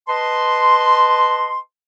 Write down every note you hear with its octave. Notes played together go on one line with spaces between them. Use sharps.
B4 D#5 A5 C6